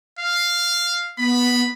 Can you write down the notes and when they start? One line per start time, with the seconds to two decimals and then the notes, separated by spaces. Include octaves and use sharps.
0.19 F5
1.19 B3 B5